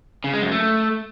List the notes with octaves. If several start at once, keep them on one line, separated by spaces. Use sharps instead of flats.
C#3
G#3
F#2
A3